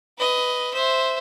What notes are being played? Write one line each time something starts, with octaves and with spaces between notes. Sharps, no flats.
B4 D#5
C5 E5